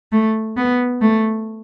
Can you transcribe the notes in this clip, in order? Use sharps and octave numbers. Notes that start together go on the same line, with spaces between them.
A3
B3
A3